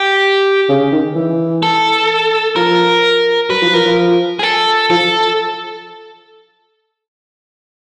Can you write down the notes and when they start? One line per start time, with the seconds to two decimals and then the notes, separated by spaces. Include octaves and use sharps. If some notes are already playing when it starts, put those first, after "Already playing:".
Already playing: G4
0.69 C#3
0.92 D#3
1.15 E3
1.63 A4
2.56 F3 A#4
3.50 F#3 B4
3.62 F3
3.73 F3 A#4
3.85 F3
4.39 G#4
4.43 A4
4.90 F3 A4